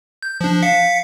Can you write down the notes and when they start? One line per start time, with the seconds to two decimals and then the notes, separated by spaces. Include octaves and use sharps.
0.23 G6
0.41 F3 D4
0.63 F5 B6 C#7